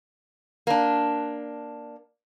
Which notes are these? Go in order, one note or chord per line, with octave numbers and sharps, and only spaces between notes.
A#3 D4